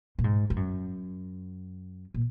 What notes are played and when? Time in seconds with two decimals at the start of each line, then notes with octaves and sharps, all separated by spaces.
0.19 A#2
0.24 G#2
0.50 G#2
0.56 F#2
2.14 A#2